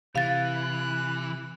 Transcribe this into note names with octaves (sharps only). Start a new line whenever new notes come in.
C3 E3 F5 F#6 A6